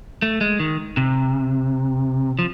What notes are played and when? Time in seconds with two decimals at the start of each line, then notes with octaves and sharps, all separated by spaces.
0.22 A3
0.41 G#3
0.59 D#3
0.97 C3
2.39 F3